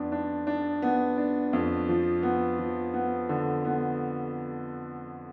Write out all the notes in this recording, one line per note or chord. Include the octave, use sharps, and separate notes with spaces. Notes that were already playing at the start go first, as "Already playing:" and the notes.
Already playing: F2 B3 D4
D4
D4
B3
D4
F2
F3
B3
F3
B3
D3
B3